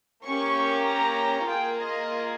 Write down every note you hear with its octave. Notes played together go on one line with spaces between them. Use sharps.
A#3 C#4 G4 C#6
A#5
A#3 F4 G#4 G5
D#5